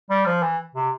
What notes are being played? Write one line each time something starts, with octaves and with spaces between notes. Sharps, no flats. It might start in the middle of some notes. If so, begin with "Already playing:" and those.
G3
F3
E3
C3